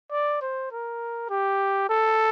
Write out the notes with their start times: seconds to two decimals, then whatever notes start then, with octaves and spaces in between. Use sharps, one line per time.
0.11 D5
0.42 C5
0.72 A#4
1.30 G4
1.89 A4